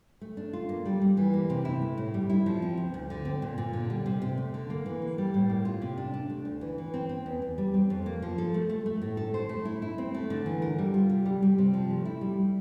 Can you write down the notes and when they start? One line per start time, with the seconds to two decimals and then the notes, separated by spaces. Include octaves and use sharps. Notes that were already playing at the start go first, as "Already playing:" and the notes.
0.21 A3
0.37 D4
0.53 F4
0.69 A#3
0.86 G3
1.01 G3
1.17 E3
1.34 A#3
1.50 C3
1.65 E4
1.81 A3
1.98 A2
2.14 G3
2.30 E4
2.46 F3
2.62 C4
2.77 D2
2.94 D2
3.10 D3
3.25 C4
3.42 A#2
3.58 A#2
3.73 D3
3.90 G3
4.06 C3
4.22 C3
4.38 A3
4.54 D3
4.70 A#3
4.86 E3
5.02 A#3
5.18 G3
5.34 A2
5.50 A#3
5.65 F4
5.82 C3
5.97 D4
6.14 D4
6.30 A3
6.45 D2
6.61 E3
6.78 E3
6.94 C4
7.09 C4
7.26 E2
7.42 E2
7.58 G3
7.74 C4
7.90 F2
8.06 A#3
8.22 F3
8.38 A4
8.54 A3
8.69 A3
8.86 A3
9.02 A2
9.17 A4
9.34 C5
9.49 A3
9.65 E4
9.82 E4
9.98 C4
10.14 A3
10.30 D3
10.46 E3
10.62 A#4
10.78 G3
10.94 F4
11.10 C3
11.25 G3
11.42 G3
11.58 C3
11.74 F3
11.90 A3
12.05 E4
12.21 G3